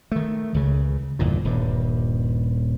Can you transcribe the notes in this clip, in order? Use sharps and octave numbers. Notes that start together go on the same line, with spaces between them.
D#3 A3
C#2 C#3
G1 E2 A#2
D#1 G2